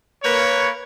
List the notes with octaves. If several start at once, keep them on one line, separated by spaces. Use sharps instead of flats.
A#3 B4 C#5